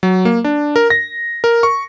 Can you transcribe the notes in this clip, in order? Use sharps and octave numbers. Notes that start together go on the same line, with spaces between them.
F#3
A#3
D4
A#4
A#6
A#4
C#6